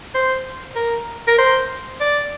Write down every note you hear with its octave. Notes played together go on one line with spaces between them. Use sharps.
C5
A#4
A#4
C5
D5